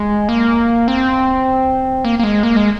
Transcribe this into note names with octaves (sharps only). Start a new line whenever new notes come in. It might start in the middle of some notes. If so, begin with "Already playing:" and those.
Already playing: G#3
A#3
C4
A#3
A#3
G#3
A#3
G#3